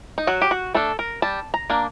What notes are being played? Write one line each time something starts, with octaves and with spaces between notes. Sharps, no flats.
D#4
F#3 F#4
G4
F#4
A3 D4 A4
A#4
G3 A5
A#5
A#3 D4